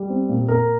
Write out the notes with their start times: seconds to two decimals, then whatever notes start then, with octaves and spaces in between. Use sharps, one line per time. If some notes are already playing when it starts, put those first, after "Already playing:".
Already playing: G3
0.10 C4
0.29 A#2
0.48 A#2 A#4